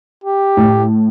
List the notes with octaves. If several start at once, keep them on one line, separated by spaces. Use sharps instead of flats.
G4
A2